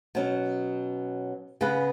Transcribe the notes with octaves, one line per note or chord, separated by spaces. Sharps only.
B2 F#3 C#4
C#3 B3 G#4 B4